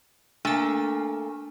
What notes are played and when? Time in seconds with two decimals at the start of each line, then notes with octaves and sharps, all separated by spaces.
0.45 A3 A#3 D4 G#5